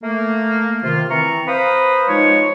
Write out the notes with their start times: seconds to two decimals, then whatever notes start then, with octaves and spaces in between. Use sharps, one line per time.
0.03 A3 A#3
0.83 C3 D#3 F4
1.10 E3 C4 A#5 C#6
1.47 B4 C5 F5 A#5 B5 D#6
2.08 F3 G#3 D#4 C#5